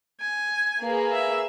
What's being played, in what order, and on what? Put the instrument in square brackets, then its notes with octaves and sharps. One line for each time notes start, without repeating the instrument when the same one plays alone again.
[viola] G#5
[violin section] A#3 G#4 B4
[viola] E5